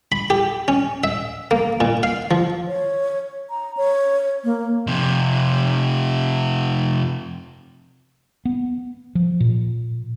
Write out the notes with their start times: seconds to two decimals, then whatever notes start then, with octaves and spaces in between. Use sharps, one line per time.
0.12 B5
0.30 G4
0.68 C#4
1.04 E5
1.51 A#3
1.81 A#2
2.03 F5
2.31 F3
2.67 C#5
3.50 A#5
3.77 C#5
4.45 A#3
4.87 F2 C3
8.45 B3
9.15 F3
9.40 A#2